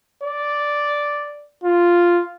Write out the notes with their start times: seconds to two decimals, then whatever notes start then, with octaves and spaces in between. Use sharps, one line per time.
0.24 D5
1.64 F4